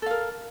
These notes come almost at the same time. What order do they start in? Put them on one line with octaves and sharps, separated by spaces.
A4 F5 A#4